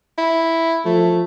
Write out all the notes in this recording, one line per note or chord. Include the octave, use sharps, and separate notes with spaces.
E4
F3 A3